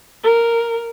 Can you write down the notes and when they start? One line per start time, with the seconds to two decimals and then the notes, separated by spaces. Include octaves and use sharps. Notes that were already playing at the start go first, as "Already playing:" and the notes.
0.23 A#4